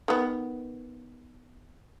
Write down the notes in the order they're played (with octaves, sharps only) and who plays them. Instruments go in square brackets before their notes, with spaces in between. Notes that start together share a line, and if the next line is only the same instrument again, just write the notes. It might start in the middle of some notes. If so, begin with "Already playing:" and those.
[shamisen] D#3 B3